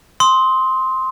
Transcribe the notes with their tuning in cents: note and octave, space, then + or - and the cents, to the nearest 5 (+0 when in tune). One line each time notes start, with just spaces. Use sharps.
C6 +0 D#6 +35